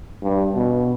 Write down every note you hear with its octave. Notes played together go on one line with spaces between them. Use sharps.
G2
B2